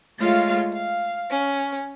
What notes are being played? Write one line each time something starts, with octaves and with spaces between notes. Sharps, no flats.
G#3 A3 F4 C#5 F5
F5
C#4